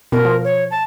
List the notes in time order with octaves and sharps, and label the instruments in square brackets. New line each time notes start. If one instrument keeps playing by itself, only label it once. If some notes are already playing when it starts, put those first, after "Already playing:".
[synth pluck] B2 [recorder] A#4
[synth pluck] F3
[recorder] C#5
A5